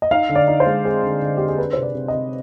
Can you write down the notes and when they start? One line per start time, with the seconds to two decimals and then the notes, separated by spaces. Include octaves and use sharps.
0.02 D#5
0.11 D#4 F5
0.29 D3
0.35 D5
0.48 D#4
0.60 C5
0.66 G#3
0.85 C4 G#4
1.03 D3
1.22 D3
1.37 C4 G4
1.48 G#4
1.58 D4 B4
1.73 C3 C5
1.83 D5
1.95 C3
2.08 D#5
2.14 C3